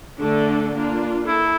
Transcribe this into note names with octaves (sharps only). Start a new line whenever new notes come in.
D3 A3 D4 A4
A#3 D4 F4
E4 A4